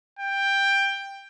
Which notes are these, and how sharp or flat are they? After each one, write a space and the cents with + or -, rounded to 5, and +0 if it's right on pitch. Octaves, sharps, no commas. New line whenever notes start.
G5 +10